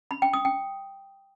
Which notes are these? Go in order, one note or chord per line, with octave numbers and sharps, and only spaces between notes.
B5
G5
D#6
G5